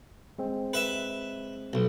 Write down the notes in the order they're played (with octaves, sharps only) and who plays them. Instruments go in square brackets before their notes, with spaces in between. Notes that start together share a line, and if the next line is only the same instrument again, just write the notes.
[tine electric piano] G#3 C4
[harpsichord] B4 E5
B1